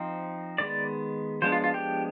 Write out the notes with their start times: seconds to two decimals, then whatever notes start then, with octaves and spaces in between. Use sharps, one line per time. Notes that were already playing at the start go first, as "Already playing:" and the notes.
Already playing: F3 C4 D#4
0.58 D#3 G#3 B3 D5
1.42 F3 G#3 B3 D4 C5
1.52 F4
1.64 F4
1.74 G4